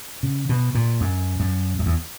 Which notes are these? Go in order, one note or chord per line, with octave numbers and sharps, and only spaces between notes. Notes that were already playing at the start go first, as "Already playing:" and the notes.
C#3
B2
A#2
F#2
F#2
F#2
E2